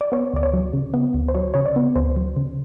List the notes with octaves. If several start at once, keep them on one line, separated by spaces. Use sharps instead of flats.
D5
B3 C#5
D2 D5
C#5
F#3
C#3
B3
D2
C5
F#3 C#5
C#3 C#5
D5
B3
D2 C5
F#3
C#3